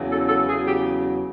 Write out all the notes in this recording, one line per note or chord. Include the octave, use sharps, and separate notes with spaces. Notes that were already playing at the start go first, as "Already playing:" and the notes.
Already playing: E2 C#3 F#3
A4
A4
E2 C#3 F#3 G#4
G4